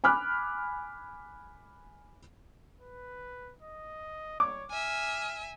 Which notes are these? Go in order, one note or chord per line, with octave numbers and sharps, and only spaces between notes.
G#5 B5 D6 F6 F#6
B4
D#5
C#5 D6
E5 G#5 F6